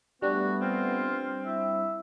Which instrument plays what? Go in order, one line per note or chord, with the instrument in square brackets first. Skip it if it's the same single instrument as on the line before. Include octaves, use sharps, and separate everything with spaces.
[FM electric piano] G3 D4 [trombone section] A3 B3 [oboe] F#4
[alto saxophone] C4 [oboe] F4
[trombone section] E4 [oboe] E5